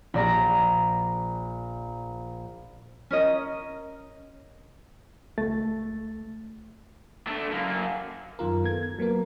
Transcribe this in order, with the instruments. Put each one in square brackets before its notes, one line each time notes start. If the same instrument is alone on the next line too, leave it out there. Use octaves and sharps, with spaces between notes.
[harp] A#1 D5 A#5
[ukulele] C#4 A#4 D#5
[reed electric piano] C#2 A3 A6
[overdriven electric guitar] A3 D4
F#2 A#3
[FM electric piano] F#2 D#3 F4 A#4
B3 A4 G#6
G#6
F#3 A#3 B3 A#4